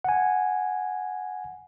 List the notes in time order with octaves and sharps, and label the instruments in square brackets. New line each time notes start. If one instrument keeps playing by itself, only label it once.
[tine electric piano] F#5 G#5